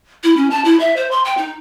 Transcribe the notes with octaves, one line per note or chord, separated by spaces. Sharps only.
E4
C#4
A5
E4
E5
C5
C6
G5
D#4